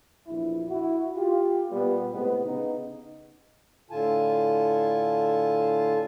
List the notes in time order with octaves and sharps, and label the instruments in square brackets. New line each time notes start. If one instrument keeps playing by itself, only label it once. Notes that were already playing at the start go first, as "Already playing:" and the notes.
[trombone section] A#1 E2 E4
E4 F#4
F4 G4
A#2 G3 B3
A2 C3 G#3 B3
C#3 B3 D#4
[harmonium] A2 D3 F4 G#5 A5